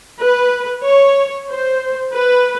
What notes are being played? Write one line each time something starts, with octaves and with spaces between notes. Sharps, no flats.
B4
C#5
C5
B4